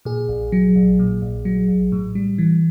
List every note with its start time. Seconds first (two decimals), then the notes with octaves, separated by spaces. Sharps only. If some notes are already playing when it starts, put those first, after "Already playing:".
0.05 A#2 G#4
0.29 A#1
0.52 F#3
0.76 A#1
0.99 A#2
1.22 A#1
1.45 F#3
1.68 A#1
1.92 A2
2.15 G3
2.38 E3